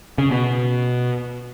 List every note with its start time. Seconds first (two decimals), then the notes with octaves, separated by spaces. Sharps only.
0.18 C#3
0.31 B2